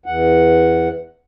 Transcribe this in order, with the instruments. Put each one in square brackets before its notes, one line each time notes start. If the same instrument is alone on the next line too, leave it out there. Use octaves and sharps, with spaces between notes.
[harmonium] E2 F#5